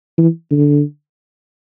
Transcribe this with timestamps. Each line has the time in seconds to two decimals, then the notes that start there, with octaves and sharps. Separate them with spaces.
0.18 E3
0.51 D3